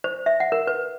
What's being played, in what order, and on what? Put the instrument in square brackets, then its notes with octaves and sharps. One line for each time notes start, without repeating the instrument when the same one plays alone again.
[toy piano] C5
E5
F#5
A#4
B4